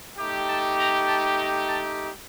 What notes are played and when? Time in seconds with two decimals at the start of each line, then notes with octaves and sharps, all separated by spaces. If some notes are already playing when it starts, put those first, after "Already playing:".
0.17 A3 D#4 G4
0.48 A5
0.79 A#5
1.08 A5
1.39 A#5
1.69 A5